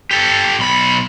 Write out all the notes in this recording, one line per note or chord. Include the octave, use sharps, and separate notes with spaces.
G4 A4
B1 B5